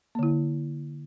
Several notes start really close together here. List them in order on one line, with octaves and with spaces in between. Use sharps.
A#3 D3 E4